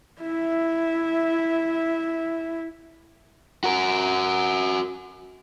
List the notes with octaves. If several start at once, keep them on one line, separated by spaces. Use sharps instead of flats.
E4 E5
F#4 A#4